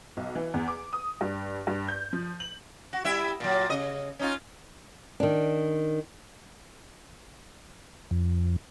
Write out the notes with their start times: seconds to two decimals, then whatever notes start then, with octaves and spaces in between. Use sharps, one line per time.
0.17 B1
0.35 E3
0.54 E2
0.68 D6
0.93 D#6
1.21 G2
1.67 G2
1.88 G6
2.13 F3
2.40 F#7
2.93 F#4
3.05 G3 E4 E5
3.40 A#2 F#3
3.69 C#3 D#5
4.19 C#4 D#4 F4
5.20 D#3 D4
8.11 F2